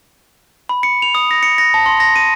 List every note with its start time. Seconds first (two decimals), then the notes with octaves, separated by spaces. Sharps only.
0.69 B5
0.83 C#7
1.02 F7
1.15 D#6
1.31 A#6
1.43 C#7
1.58 A#6
1.74 A5
1.86 C6
2.00 A#6
2.16 D#7